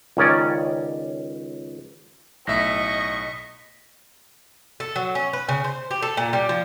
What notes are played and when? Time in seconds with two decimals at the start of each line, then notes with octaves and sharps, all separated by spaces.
0.17 C#2 D#3 C#4 D5
2.47 B1 A2 D#5 E5 C#6 A#6 B6
4.80 A4
4.96 F#3
5.15 C#4
5.33 B4
5.49 C#3
5.64 C5
5.91 G4
6.02 A4
6.17 A#2
6.33 G3
6.49 F3